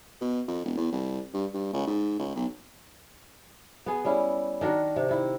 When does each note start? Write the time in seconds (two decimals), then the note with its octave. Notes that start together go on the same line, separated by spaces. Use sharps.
0.21 B2
0.48 F2
0.65 E1
0.77 E2
0.92 C2
1.34 G2
1.54 G2
1.73 C#2
1.88 G#2
2.19 C#2
2.36 B1
3.86 B3 G#4
4.05 G3 C#4 E4
4.61 D#3 D4 F#4 A#4
4.96 C3
5.09 D#3 E4